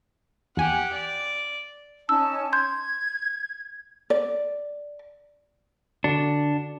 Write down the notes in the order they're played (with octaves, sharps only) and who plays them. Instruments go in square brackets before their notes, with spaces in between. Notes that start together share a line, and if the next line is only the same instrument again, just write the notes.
[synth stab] E2 G#5 [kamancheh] G4 F#5
[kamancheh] D5
[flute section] C#4 D#4 A5 [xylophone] E6
[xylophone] C6 G6 [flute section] G#6
[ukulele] D5
[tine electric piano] D3 F#4 C#7 [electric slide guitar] D4